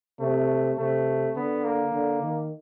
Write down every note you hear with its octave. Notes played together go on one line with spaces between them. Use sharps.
C3 A3
C3 A3
D3 B3
A#3
D3
D#3